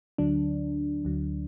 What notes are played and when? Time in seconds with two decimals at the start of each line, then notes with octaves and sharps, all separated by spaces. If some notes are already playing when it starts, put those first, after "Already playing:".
0.18 D2 D3 F#3 D4
1.05 D2 D3 F#3